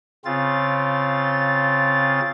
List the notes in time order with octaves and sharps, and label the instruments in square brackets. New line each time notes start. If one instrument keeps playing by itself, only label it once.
[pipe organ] C#3 C4 F4 A6